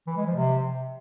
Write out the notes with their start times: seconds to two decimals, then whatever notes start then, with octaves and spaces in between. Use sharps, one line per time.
0.07 E3
0.17 G#3
0.27 F3
0.36 C3